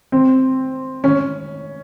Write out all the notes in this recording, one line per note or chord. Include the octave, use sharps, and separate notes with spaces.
C4
C#4